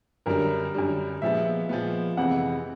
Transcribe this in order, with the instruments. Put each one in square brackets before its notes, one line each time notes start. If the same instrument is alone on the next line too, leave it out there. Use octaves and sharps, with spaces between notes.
[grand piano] F#2 D3 G3 [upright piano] A#4
[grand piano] F#2 D3 G3
[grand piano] A#2 F3 G#3 B3 [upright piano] E5
[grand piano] A#2 F3 G#3 B3
[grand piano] F2 C3 E3 G#3 C4 [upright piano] F#5